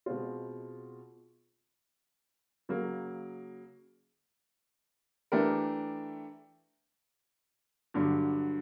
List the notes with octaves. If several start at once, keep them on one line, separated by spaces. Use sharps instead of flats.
B2 G#3 C4 F4
C#3 F#3 A#3
E3 A3 D4 G4 A#4
G2 D3 F#3